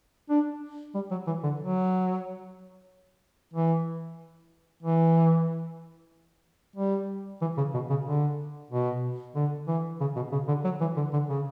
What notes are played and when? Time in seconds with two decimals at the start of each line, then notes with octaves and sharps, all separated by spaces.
0.30 D4
0.95 G3
1.11 F#3
1.27 E3
1.44 D3
1.60 F#3
3.54 E3
4.83 E3
6.76 G3
7.41 E3
7.57 C#3
7.74 B2
7.90 C#3
8.06 D3
8.71 B2
9.35 D3
9.67 E3
10.00 C#3
10.16 B2
10.32 C#3
10.48 D3
10.64 F#3
10.81 E3
10.97 D3
11.13 D3
11.29 C#3